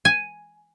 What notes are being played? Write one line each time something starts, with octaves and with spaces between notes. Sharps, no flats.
G#5